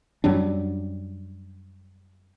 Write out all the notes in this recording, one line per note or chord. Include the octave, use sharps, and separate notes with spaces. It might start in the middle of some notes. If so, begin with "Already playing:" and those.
F#2 F#3 G3 D4